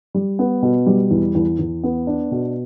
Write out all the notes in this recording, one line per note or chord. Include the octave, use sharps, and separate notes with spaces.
G3
B3
B2
G3
E2
E2
E2
B3
D4
B2